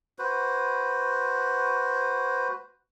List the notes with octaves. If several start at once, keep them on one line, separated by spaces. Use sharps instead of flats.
F#4 B4 C5